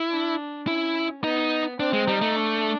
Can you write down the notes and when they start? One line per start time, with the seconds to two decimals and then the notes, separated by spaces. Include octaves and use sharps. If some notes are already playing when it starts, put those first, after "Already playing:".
Already playing: E4
0.10 D4
0.67 C#4 E4
1.23 B3 D#4
1.80 C4 D4
1.93 G#3
2.08 G3 D#4
2.21 A3
2.36 D4